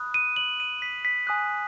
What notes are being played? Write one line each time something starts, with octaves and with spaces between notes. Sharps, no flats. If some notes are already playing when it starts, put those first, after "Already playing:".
Already playing: B5 D#6 F#6
D#7
F#7
D#7
B6
B6
G#5 D#6 F#6